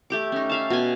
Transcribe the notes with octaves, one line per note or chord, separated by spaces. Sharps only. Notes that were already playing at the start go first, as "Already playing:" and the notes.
A3 G4 D6
C#4 D#4
E5 F5 A5
B2 G#5